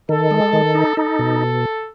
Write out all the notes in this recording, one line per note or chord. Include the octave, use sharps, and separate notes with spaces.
D#3 A4
G#3
D#3
D#4
D#4 A4
B2